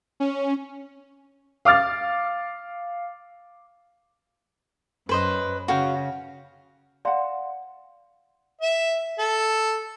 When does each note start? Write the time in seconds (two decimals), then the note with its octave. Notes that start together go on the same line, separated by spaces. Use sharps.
0.20 C#4
1.65 F5 D6 F6 A6
5.09 F#2 B4 C5 D#5
5.68 C#3 F#4 F5 G5
7.05 D5 F5 F#5 A5 C6
8.61 E5
9.18 A4